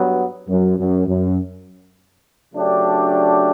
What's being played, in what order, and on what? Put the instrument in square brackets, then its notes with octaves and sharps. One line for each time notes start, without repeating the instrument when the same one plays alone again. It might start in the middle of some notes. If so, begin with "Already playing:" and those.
Already playing: [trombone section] G2 F#3 B3
[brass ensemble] F#2
F#2
F#2
[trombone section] C#3 F#3 A3 D4 G4